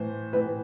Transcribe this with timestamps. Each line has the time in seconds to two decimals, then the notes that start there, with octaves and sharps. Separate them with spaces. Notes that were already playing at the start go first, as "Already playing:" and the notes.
Already playing: A2 E3 C5
0.33 A2 E3 B4